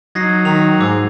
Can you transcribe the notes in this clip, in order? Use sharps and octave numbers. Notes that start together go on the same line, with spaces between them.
F#3 D#4 G#6 A#6 C7
D#3 F7
G#2 D6 E6